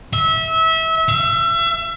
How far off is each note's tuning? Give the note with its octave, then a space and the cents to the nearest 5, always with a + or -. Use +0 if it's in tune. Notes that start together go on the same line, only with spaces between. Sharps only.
E5 -25
E5 +35